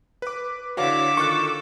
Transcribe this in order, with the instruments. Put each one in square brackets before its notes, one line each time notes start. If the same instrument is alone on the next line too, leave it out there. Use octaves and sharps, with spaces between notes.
[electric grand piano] B4 D6
[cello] D3 E4 [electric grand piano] F#4 C#5 F5 [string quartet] D6 E6
[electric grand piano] D#3 F4 F#6 [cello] A4 [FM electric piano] C#6